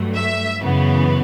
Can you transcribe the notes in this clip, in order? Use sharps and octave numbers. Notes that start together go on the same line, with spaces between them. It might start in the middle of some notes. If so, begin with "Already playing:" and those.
Already playing: G2 F#3 A3
E5
F#2 C#3 E3 B3